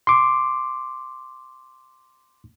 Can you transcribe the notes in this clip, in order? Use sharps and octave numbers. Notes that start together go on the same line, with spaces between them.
C6 D6